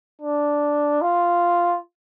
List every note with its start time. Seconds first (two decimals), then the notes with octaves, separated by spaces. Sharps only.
0.21 D4
1.01 F4